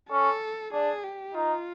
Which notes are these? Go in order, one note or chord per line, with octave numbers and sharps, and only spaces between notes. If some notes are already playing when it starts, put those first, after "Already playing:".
C#4 A4
D4 G#4
G4
D#4 F4